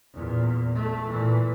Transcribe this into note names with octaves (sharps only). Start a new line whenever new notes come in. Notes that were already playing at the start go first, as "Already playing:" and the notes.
E2 A#2
A3
A#2 E3